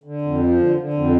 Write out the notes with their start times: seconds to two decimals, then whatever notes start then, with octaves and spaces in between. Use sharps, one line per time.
0.04 D3
0.22 F2
0.39 F3
0.58 D3
0.76 D3
0.94 F2